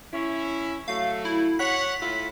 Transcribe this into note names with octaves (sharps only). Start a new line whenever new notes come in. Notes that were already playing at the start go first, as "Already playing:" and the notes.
C#4 E4
F#3 A3 F5
E4
C#5 F#5 B6
A2 E4 F4